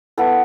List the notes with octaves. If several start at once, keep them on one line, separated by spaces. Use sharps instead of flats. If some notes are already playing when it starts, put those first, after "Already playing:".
B3 E4 A4